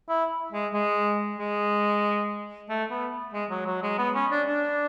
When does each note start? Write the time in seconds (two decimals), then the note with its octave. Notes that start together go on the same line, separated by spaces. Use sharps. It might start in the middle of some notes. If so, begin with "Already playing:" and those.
0.09 E4
0.52 G#3
0.74 G#3
1.39 G#3
2.69 A3
2.91 B3
3.34 G#3
3.50 F#3
3.67 F#3
3.83 G#3
3.98 B3
4.15 C#4
4.31 D4
4.48 D4